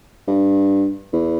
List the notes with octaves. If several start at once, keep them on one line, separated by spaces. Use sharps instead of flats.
G2
E2